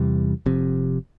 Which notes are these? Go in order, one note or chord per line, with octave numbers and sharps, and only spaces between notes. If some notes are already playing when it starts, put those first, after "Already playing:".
Already playing: E2 C3 E3 G3
F1 F2 C3